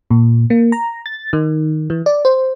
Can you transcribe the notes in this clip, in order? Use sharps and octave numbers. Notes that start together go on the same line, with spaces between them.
A#2
A#3
A#5
A6
D#3
E3
D5
C5